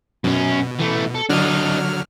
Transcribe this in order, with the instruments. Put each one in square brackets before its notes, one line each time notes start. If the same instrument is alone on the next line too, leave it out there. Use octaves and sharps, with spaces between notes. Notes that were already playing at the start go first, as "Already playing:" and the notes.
[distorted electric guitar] F#2 C#4 [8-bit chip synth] B2
[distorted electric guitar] E3 A3
A4
[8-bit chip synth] D3 F#3 F6 [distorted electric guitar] D4 D#5